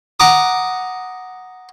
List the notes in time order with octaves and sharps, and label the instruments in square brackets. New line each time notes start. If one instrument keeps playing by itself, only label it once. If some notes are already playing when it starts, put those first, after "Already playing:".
[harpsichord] F#5 A#5 D6 D#6